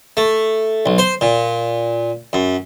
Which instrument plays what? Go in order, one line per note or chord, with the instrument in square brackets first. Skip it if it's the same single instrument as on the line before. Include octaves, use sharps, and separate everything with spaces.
[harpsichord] A3
B1
C5
A#2
F#2